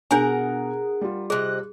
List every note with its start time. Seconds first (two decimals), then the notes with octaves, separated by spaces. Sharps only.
0.11 B2 D4 G#4 A#4 F#5 G#5 A#5
1.01 G3 F4
1.30 C3 G#4 D#5 F#6